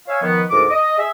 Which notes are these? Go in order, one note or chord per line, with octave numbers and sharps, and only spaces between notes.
C#5 E5 F5 G#5
D#3 F3 B3
D2 G#2 A4 A#4 D6
D#5
G#4 E5